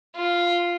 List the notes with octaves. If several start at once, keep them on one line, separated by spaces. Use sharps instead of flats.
F4